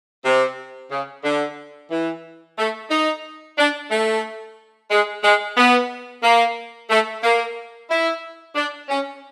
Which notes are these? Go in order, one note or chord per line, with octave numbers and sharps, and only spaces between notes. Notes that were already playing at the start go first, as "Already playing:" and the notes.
C3
C#3
D3
E3
A3
D#4
D4
A3
G#3
G#3
B3
A#3
A3
A#3
E4
D4
C#4